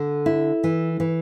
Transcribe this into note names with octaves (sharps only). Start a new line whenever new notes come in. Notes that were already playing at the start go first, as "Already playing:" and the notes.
Already playing: D3
E4
E3
E3